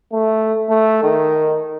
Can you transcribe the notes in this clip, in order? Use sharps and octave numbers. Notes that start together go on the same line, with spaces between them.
A3
A3
D#3